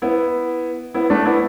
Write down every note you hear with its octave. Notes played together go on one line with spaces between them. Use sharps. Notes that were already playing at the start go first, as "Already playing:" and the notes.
B3 E4
B3 E4
A3 D4
B3 E4